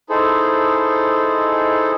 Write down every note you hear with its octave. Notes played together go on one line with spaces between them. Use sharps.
D#4 E4 G#4 A4 C5